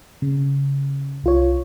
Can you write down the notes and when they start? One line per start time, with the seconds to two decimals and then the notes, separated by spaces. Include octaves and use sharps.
0.22 C#3
1.23 C2 F4 C#5